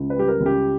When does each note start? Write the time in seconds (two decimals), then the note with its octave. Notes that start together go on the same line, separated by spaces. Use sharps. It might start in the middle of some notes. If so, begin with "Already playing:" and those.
Already playing: C#2
0.10 B4
0.16 G3 G4
0.28 A#4
0.40 C#2
0.46 G4